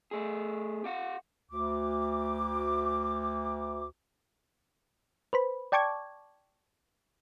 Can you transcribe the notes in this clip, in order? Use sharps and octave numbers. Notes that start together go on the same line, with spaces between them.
A3 G#4
G4 F5 F#5
D2 D6
B4 C5 B5
D5 G5 A5 C#6 D6 G#6